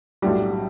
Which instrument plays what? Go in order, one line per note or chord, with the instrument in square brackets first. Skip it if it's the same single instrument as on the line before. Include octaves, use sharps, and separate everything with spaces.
[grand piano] B1 A2 F#3 A3 D4 [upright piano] G3